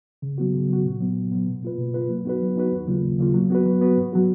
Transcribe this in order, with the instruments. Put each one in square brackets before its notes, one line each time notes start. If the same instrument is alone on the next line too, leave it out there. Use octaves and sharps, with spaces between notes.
[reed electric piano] C#3
F#3 B3 F#4
C#3
F#3 B3 F#4
A#2
F#3 B3
A#2
F#3 B3
B2
A#3 F4 B4
B2
A#3 F4 B4
F#3
B3 D#4 F#4 B4
F#3
B3 D#4 F#4 B4
D#2
C#3 F#3 A#3 F4
D#2
C#3 F#3 A#3 F4
F#3
B3 F#4 B4
F#3
B3 F#4 B4
G#2
F#3 B3 F#4